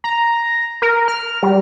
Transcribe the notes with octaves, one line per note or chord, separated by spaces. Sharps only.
A#5
A#4
F6
G3